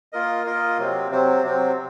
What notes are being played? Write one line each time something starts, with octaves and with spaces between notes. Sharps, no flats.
A#3 F4 A#4 D#5
A#3 F4 A#4 D#5
C3 F#3 C4
C3 F#3 C4
C3 F#3 C4